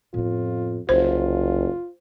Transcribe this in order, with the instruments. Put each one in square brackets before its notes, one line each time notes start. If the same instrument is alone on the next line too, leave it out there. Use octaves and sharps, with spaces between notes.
[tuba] F2 [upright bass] A2 B3 [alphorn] F4
[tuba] F#1 [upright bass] C2 [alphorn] F4 [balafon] C5